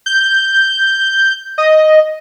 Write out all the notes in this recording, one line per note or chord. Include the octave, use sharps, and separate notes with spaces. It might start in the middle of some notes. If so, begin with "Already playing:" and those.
G6
D#5